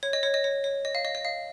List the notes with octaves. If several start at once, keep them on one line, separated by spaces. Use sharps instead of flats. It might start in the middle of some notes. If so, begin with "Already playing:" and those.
C#5
D#5
C#5
D#5
C#5
C#5
D#5
F5
D#5
D#5
F5